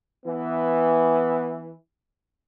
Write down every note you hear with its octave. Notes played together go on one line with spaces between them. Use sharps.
E3 B3